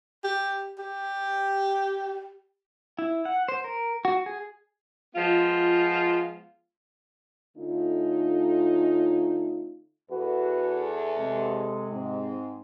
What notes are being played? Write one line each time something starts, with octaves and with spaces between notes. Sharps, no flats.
G4
G4
E4
F#5
C5
A#4
F#4
G#4
F3 G#3 B3 F4
D3 A3 C#4 D#4 F4
E2 F#4 G#4 A4 B4
C3 G#3
G#2 C4